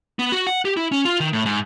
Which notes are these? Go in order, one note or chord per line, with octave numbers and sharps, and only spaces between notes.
B3
F#4
F#5
G4
E4
C#4
F4
D#3
A2
G#2